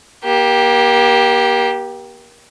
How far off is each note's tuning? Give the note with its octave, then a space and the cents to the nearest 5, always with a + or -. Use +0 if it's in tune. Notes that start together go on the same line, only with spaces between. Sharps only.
A#3 +30 G4 +0